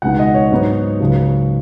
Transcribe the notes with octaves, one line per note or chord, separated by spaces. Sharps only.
C#2 B2 G#3 D#4 F#5
D#5
C#5
G#2 F#3 B3 D#4
C#2 C#3 F#3